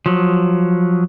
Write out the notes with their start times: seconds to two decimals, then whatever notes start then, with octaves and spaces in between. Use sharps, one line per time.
0.06 F3 F#3